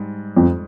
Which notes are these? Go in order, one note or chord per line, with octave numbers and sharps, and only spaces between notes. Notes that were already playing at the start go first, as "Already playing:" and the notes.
Already playing: G#2 G3
F2